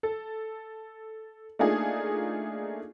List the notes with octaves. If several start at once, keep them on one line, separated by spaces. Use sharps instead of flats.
A4
A3 A#3 D4 D#4 F4 G#4